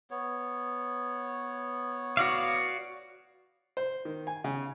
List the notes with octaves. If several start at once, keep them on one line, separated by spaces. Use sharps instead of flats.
B3 C#5
F#4 D5 F5
C5
D#3
G#5
C#3